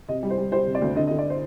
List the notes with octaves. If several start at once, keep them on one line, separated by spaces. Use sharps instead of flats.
C3 D#5
G3
C5
G3
G3 C5
C3
D5
D2
D3 D#5
D#5
D3
D5
C5